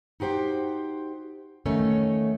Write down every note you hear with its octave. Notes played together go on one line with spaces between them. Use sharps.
D#4 F#4 G4 C5 G5
E2 D#3 A3 C#4 D#4